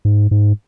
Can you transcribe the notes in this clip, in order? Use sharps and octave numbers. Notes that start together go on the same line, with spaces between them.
G#2
G#2